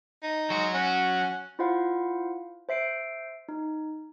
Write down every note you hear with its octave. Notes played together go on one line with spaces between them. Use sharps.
D#4
F#3 G#3 F#4
C#4 F#5
E4 F4 C5 F5 F#5
C5 E5 C7 D7
D#4